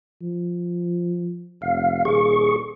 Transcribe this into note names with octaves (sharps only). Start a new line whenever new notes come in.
F3
F1 F5
D#1 G#4 C#6